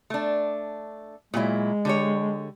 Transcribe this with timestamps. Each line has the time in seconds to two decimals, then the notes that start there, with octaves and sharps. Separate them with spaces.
0.10 A3 D4
1.34 A#2 F#3 G#3 E4
1.85 D3 G4 C#5